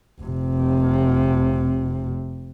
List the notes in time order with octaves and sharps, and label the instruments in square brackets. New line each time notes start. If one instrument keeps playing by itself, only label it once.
[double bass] F1 C3